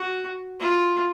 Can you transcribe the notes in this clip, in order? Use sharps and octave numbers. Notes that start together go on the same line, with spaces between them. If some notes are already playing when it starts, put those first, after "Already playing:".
Already playing: F#4
F4